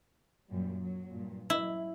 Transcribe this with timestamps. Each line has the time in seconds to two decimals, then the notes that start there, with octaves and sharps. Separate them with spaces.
0.49 F#2 A#2 G3
0.80 F#3
1.09 G2 A#2
1.50 F#3 E4